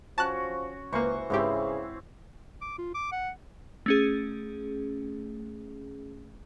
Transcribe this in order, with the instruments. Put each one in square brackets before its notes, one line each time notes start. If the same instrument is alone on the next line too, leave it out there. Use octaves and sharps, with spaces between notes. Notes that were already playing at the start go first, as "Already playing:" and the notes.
[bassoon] F3 [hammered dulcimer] C#4 F#4 [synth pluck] A5 F#6
[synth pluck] C#2 A#3 [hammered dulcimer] E3 C5 C#6 [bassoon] B4
[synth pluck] G#2 G4 [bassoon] C#3 [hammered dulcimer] E3 C4 E4
[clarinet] D6
F4
D6
F#5
[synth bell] A3 C#4 G#4